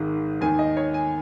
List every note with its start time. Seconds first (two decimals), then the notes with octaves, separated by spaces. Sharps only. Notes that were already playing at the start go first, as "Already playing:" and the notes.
Already playing: G#1 G#2 D#3
0.41 D#2 D#3 G#5
0.59 D#5
0.77 C#5
0.94 G#5